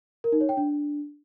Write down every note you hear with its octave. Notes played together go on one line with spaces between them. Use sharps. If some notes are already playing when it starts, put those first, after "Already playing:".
A#4
D#4
C#5
G5
D4